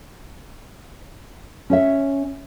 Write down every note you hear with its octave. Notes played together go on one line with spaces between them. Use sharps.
C#4 C#5 E5